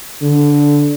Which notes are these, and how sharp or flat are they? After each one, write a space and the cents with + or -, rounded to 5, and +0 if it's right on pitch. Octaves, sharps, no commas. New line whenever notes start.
D3 -10